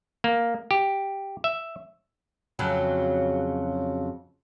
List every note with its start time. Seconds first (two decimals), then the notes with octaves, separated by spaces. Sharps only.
0.24 A#3
0.71 G4
1.44 E5
2.59 F2 C#3 F#3